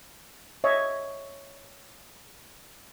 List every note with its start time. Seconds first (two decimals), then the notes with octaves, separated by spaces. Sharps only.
0.64 C#5 D#5 E5